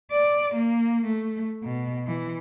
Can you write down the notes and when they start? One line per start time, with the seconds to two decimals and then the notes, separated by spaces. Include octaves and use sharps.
0.11 D5
0.55 A#3
1.06 A3
1.63 B2
2.07 E3